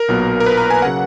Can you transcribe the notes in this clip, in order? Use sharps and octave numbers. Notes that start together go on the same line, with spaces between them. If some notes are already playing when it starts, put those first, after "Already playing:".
Already playing: A#4
B1 A#2 F#3 B3
A#4
B4
A#5
G#5
C#3 F#3 F#5